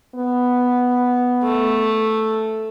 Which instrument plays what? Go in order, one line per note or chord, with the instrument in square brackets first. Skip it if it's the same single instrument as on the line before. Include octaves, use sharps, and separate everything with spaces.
[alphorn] B3
[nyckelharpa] A3